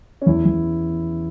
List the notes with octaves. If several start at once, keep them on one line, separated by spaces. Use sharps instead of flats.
C#4
E2 E4
E2